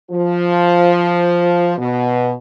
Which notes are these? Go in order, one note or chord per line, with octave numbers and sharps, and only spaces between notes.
F3
B2